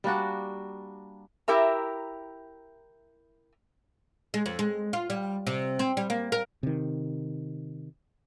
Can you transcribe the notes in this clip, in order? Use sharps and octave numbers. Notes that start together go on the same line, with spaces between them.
G3 A#3 D4 F#4
E4 G4 A#4 E5 A#5
G#3
F2
G#3
F4
G3
C3
C4
G3
A#3
A#4
C3 D#3